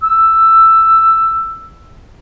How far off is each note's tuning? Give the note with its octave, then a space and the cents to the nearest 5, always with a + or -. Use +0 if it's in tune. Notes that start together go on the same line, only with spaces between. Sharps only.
E6 +10